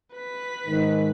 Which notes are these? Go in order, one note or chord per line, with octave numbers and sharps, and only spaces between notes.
B4 B6
G#2 D#3